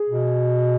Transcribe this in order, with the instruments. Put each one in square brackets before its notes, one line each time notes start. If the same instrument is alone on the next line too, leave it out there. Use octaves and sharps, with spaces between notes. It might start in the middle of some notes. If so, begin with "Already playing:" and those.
Already playing: [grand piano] G#4
[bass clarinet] B2